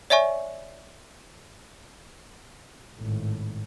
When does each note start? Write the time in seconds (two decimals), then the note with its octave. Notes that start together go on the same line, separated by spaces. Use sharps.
0.10 C#5 D5 E5 G#5 C#6
2.96 G#1 A2